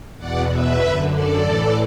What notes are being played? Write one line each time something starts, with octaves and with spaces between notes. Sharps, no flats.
E2 B2 D5 F#5
B4 E5
F#2 D3
A4 D5
A2 E3